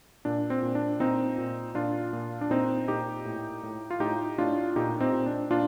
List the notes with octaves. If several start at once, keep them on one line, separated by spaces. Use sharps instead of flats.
A#2 D4
C4
A#2
D4
A#2 C4 D#4
A#2
A#2 D4 F4
A#2
D4
A#2 C4 D#4
A#2 D#4 G4
A2
A2
F4
A2 D#4 G4
A2 D4 F4
A#2 D#4 G4
C4 D#4
A#2
D4
A#2 D4 F4